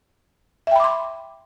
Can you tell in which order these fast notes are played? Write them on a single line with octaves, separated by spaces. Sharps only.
E5 G5 B5 D6 C6